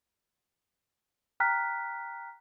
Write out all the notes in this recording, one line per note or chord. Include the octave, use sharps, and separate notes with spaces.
G5 A#5 F6 F#6 B6